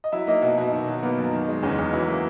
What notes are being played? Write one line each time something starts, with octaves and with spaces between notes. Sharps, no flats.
D#5
F#3 E4 E5
A#3 D#4 D#5
B2 F#3 F#4
B2
D#3
F#3
A#3 B3
F#2
D#3
G#3
E2 C#3 C#4
E2
E3 F#3 E4
A#3